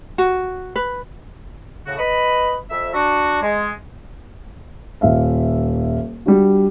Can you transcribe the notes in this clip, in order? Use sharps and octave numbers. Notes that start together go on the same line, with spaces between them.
F#4
B4
A2 C#3 F#4
B4 D#5 B5
F2 E5
D4 F#4
G#3
D#1 E5 F5
G3 D4 F#4